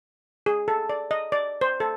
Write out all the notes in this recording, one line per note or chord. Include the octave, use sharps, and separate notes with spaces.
G#4
A4
D5
D#5
D5
C5
A4